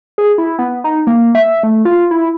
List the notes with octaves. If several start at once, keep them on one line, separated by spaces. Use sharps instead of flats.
G#4
E4
B3
D#4
A#3
E5
A3
F4
E4